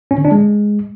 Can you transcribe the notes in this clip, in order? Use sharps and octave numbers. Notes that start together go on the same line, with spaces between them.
C#4
D3
D4
G#3